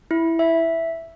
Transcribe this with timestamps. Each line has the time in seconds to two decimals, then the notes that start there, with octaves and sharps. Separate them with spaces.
0.11 E4
0.39 E5